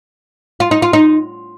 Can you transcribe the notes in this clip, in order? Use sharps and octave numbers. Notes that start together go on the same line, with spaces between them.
F4
D#4
F4
D#4